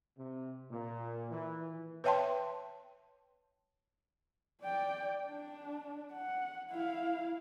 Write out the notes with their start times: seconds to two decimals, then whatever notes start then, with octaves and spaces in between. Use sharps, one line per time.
0.17 C3
0.70 A#2
1.31 E3
2.04 B4 C#5 E5 G5 A5 C6
4.63 D5 G5
5.27 D4
6.12 F#5
6.71 E4 F5